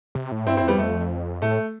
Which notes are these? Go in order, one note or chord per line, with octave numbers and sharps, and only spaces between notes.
C3
A2
G2 C4 E4
C4 E4
F2
G3 B3
F2 A3
A2 A3